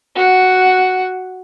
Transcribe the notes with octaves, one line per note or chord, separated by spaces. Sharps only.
F#4 F#5